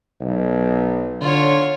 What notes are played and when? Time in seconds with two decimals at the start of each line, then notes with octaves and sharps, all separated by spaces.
0.21 B1
1.21 D3 F4 C#5